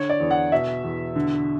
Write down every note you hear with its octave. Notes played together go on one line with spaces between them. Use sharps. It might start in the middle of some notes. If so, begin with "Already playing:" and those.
Already playing: D3 C#5
D5
E2
F#5
B2 E5
E2
D3